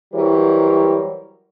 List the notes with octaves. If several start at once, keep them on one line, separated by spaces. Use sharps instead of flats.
E3 F#3 G3 A#4 C5 C#5